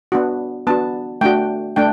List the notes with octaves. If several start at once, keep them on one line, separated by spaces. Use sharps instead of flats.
B3 D4 F#4
B3 D4 F#4 A5
A3 D4 F#4 G5
A3 D4 G5